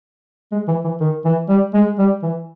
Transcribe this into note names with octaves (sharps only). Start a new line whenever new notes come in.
G#3
E3
E3
D#3
E3
G3
G#3
G3
E3